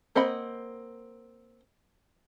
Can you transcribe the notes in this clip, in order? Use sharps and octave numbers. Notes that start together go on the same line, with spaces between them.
A#3 C4 D#5 F#5 B5